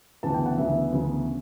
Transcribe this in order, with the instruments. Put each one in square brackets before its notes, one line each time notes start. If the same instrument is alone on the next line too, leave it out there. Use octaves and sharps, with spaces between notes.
[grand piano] D2 C#3 E3 B3 A5
G5
F#5
D2 C#3 E3 B3 E5
D2 C#3 E3 B3